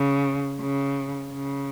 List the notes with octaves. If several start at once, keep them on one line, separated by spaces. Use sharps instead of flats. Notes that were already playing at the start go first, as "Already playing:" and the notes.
Already playing: C#3
C#3
C#3